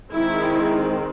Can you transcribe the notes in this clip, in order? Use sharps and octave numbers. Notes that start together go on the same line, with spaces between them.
D#3 G#3 C4 E4